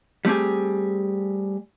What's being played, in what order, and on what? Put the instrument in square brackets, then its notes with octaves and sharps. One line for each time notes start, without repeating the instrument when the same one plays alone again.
[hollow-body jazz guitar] G3 A3 C4 G4 G#4